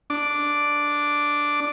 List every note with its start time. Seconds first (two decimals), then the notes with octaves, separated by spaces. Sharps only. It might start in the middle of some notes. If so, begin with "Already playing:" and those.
0.10 D4 D6